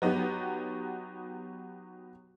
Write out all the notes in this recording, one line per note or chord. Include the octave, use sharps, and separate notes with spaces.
F#3 B3 D#4 F#4 G4